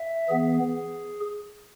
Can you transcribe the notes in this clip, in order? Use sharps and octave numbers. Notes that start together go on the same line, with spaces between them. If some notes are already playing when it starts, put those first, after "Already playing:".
Already playing: E5
E3 B3 G#4